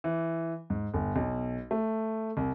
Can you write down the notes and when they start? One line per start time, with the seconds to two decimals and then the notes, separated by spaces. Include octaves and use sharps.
0.04 E3
0.70 G#2
0.94 G1
1.16 B1
1.71 A3
2.37 C2